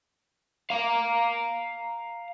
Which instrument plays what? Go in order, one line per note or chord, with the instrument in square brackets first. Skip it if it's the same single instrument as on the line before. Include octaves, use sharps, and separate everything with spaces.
[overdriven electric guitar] F5 A#5